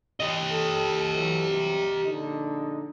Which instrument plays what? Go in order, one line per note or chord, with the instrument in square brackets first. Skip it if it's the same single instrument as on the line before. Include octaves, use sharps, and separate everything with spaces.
[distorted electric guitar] G4 D#5
[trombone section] A4
E3 F#3 A4
C3 F#3 G3
A#1 D3 D#4